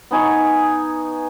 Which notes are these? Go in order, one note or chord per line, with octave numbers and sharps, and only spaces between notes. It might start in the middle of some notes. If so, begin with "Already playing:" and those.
B3 D#4 G#5 C#6